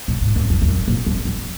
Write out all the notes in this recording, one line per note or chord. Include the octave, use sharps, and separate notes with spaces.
A#2
G#2
F#2
F2
F2
F#2
A#2
F#2
F2